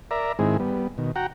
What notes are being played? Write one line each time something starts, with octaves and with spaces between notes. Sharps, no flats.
A#4 D5 E5 A#5
G#2 D#3 G#3 C4 E4 G#4
G3 B3
B2 D#3
F#4 F#5 G5 A#5